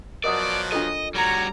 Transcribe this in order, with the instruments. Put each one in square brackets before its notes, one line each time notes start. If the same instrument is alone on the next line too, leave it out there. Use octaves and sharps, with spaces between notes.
[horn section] B2 F3 F#3 [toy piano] A#4 D#5 D#6 [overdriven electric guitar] D5
[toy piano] D4 F4 A4 [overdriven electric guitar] D#5
[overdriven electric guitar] G3 F#4 [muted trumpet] C#5 [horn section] A#5